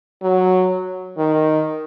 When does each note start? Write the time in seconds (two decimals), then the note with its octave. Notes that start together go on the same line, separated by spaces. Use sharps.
0.22 F#3
1.17 D#3